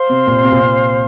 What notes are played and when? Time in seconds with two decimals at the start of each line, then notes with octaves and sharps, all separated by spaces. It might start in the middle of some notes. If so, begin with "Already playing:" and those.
Already playing: C5 F5 C6
0.09 C3
0.27 A#2
0.43 C3
0.51 A#2
0.60 C3